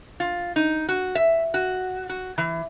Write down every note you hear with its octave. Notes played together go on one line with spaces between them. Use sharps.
F4
D#4
F#4
E5
F#4
F#4
E3